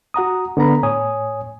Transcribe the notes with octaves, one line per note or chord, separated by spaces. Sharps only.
F#4 F#5 A#5 D#6
D3 B3 A4 A#5 B5
A2 C#5 G#5 D#6